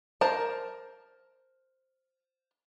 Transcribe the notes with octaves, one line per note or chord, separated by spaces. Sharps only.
A#4 C5 A5